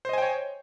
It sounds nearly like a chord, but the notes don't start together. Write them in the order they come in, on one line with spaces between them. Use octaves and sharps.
C5 D#5 G#5 G5 C#5